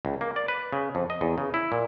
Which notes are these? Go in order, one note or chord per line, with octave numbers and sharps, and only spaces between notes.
C#2
A#3
D5
B4
C#3
F2
D#5
E2
C#3
E4
A#2